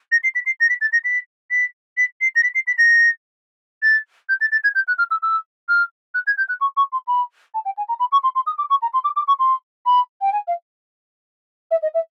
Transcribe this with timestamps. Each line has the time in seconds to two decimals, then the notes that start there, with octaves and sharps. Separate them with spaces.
0.12 A#6
0.24 C7
0.35 B6
0.46 C7
0.60 A#6
0.69 B6
0.81 A6
0.93 A#6
1.04 B6
1.51 B6
1.97 B6
2.21 C7
2.36 A#6
2.43 B6
2.55 C7
2.67 B6
2.78 A#6
3.83 A6
4.29 G6
4.41 A6
4.52 A6
4.64 G#6
4.75 G6
4.88 F#6
4.98 F6
5.11 E6
5.22 E6
5.69 F6
6.14 F#6
6.27 G#6
6.38 G6
6.49 F#6
6.61 C#6
6.77 C#6
6.92 C6
7.07 B5
7.54 A5
7.65 G5
7.77 G#5
7.89 A#5
8.00 B5
8.12 C#6
8.23 C6
8.35 C6
8.47 D#6
8.58 D6
8.70 C#6
8.82 A#5
8.94 C6
9.04 D6
9.16 D6
9.28 C#6
9.39 C6
9.86 B5
10.21 G5
10.32 G#5
10.48 F5
11.71 E5
11.82 D#5
11.94 E5